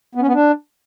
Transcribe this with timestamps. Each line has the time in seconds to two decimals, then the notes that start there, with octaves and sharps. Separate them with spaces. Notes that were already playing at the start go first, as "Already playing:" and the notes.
0.15 B3
0.21 C#4
0.27 B3
0.34 D4